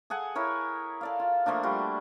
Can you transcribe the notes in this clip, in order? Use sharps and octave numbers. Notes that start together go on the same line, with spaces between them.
G#4 A4 F#5 G#5
E4 A#4 C#5
A4 D5 F5
F4
F3 A3 A#3 D4
G3 F#4 C6